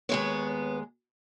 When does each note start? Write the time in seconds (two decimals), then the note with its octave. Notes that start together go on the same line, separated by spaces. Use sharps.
0.09 D#2 C#3 G#3 B3 C#5